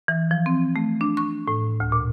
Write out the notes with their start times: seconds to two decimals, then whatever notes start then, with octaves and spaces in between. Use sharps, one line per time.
0.08 E3
0.31 F3
0.46 C4
0.76 A3
1.01 D4
1.17 C#6
1.48 A2
1.80 D2
1.92 A#2